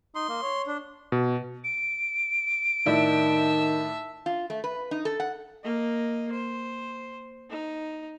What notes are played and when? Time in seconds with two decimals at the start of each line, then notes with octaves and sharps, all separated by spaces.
0.15 D#4 C6
0.29 A#3
0.42 C#5
0.67 D4
1.12 B2
1.64 D7
2.86 A2 D#3 D4 E4 E5 A5
4.26 F4
4.50 A3
4.64 B4
4.91 D#4
5.05 A4
5.20 F#5
5.64 A#3 D#5
6.31 C5
7.50 D#4